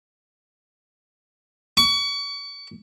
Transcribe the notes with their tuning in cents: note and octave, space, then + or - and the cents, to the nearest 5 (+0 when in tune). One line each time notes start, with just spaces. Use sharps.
C#6 +35